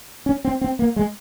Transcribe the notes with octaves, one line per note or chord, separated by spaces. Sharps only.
C#4
C4
C4
A#3
G#3